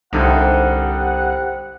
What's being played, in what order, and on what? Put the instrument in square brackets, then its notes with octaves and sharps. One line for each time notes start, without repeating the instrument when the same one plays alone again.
[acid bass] C2 [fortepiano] G2 D3 D#4 [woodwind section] G4 C5 F#5